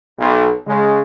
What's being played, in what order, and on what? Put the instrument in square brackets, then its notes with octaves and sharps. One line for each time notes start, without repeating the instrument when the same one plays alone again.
[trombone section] B1
C#3 G#3